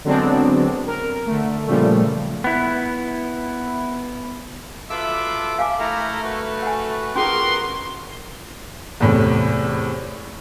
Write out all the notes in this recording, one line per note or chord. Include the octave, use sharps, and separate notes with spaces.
D3 F#3 G#3 B3 C4 D4
A#4
D3 A3
A#2 C#3 F3 G3 A3
B3 E4
F#3 F4 A4 B4 E5 D6
F5 G#5 D6
A3 E4 A#4 A#5
F#4 B4
F#5 G#5
A#3 B3 C#4 F4 G#4 A#4 C6
E2 A2 C3